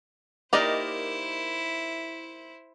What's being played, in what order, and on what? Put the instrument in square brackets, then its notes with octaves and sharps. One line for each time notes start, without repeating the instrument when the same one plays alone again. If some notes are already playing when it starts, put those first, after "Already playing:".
[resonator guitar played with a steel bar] A#3 D#4 A#4 [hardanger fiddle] E4 C5 [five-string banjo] G4 D5 D#5